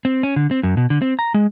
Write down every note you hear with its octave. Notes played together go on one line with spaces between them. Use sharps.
C4
C#4
D3
C4
F#2
B2
D3
C4
A#5
G#3